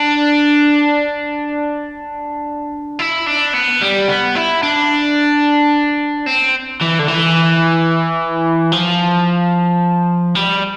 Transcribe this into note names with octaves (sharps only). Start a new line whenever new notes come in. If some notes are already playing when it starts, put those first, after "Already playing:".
Already playing: D4
E4
D4
B3
G3
B3
E4
D4
C4
E3
D3
E3
F3
G3